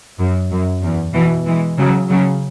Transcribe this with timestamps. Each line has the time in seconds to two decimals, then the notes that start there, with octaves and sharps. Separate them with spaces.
0.19 F#2
0.51 F#2
0.83 E2
1.15 B2 E3
1.46 E3 G#3
1.77 C#3 F#3
2.10 C#3 F#3